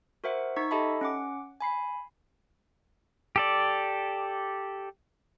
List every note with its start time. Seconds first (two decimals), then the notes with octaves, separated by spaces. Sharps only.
0.24 F#4 A#4 C5 E5 F#5
0.56 D#4 C#6 G#6 B6
0.71 G4 A4 D#5 E5 A5 B5
1.01 C#4 F#5 D6
1.61 G#5 B5 C7
3.36 G4 A4 D5